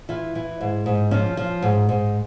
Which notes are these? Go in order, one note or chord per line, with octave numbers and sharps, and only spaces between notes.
E3 F4
E3
G#2
G#2
F3 C#4
F3
G#2
G#2